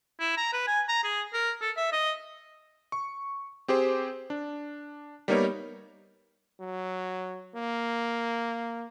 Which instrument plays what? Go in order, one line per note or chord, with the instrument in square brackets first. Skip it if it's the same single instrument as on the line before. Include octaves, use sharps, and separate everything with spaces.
[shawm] E4
A#5
B4
G#5
A#5
G#4
A#4
A4
E5
D#5
[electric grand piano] C#6
C4 G4 G#4 C5
D4
G3 A#3 B3 D#4 A#4 C#5
[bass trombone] F#3
A#3